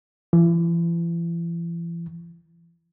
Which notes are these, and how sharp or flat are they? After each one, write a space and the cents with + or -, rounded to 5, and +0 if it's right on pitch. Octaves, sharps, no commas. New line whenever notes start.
E3 +40